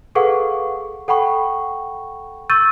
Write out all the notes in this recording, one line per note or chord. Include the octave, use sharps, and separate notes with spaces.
G#4 A4 B4 F5 F#5 C#6
A4 F#5 G5 B5 C#6
C#6 E6 G6 A6 D#7